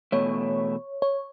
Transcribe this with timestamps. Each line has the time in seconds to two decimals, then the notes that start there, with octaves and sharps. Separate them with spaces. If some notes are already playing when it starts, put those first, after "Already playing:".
0.12 E2 B2 A3 C#5
1.02 C#5